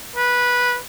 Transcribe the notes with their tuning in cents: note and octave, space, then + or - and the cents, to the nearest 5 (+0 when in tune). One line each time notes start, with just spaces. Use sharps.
B4 -10